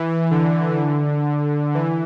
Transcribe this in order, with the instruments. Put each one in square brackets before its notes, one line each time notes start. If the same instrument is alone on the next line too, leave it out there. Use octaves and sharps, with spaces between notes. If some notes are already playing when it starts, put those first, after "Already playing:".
Already playing: [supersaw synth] E3
D3
E3